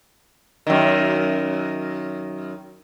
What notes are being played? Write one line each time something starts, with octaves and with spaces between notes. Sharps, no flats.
F#2 D#3